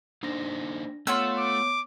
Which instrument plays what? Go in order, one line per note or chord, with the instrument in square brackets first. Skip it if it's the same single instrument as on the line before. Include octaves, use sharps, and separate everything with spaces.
[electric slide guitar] A#3 D#4 C5 [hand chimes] D4 A#6
[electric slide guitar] A3 [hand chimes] B3 C#5 [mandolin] F4 F#5 E6
[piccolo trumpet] D6